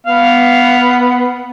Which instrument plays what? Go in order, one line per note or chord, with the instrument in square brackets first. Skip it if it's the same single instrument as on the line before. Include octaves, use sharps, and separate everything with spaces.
[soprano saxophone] B3 [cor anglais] F5